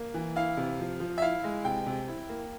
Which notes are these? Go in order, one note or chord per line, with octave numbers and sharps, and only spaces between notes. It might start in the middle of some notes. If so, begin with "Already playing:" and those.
Already playing: A#3
E3
E4 F5
C3
F3
F3
E5
E4 F5
G#3
C3 G5
C3
E4
A#3